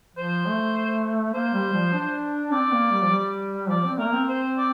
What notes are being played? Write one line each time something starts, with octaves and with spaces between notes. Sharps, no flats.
F3 C5
A3
A#3 C5
G3
F3
D4
C4 D5
A#3
G3
F3
G3
F3 D5
C4
A3 A#4
A#3
C4
C5
D5